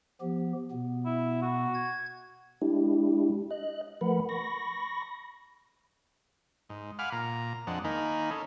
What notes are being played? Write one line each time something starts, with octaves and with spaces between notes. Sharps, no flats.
F3 B3 G4
B2 B3
E4
F#4
G#6
G#3 D4 E4 G4
D#5 F#6
F3 A3 A#4 B4 F#5 B5
B5 C#6 A#6
G#2
F5 F#5 G#5 B5 D6 F6
A#2 A#5
F2 G#3 D4 F#5
D#3 A#3 D#4 G#5 B5
C#4 A4